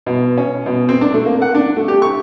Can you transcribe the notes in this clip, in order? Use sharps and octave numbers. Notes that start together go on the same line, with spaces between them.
B2
C#4
B2
C4
D4
A3
A#3
F#5
D4
A3
G4
C#6